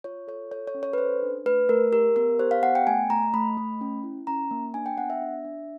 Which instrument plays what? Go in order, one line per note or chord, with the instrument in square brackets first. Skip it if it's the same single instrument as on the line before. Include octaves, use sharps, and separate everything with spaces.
[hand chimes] F4 C#5
A4 C#5
A4 C#5
C#5
C#4
C#5
B4
A4 C5
D4
A3 B4
A3 A#4
G4 A#4
B3 A#4
G4 C5
F5
B3 F#5
G5
A3 G#5
A3 A#5
A3 B5
A3
C#4
E4
C#4 A#5
A#3
D4 G#5
G5
B3 F#5
E5
D4
D4